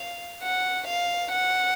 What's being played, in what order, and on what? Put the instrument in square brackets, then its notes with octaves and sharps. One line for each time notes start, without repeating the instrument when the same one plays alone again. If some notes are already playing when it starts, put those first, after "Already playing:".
Already playing: [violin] F5
F#5
F5
F#5